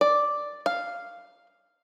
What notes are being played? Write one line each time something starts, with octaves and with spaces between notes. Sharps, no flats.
D5
F5